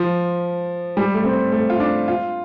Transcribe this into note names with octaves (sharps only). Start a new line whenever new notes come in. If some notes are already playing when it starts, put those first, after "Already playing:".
Already playing: F3
G3
A3
C4
A3
F4
D4
F4